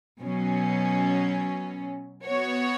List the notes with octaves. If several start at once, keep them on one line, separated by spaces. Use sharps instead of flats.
B2 F#3 C#4
B3 F#4 C#5